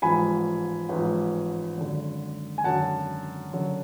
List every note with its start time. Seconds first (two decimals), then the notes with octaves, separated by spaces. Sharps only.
0.02 A1 G#2 F3 G#5 B5
0.89 A1 G#2 F3
1.77 G#1 F#2 D3
2.58 G#5
2.64 G#1 F#2 D3 F#5 A5
3.52 F#1 F#2 D3 F#3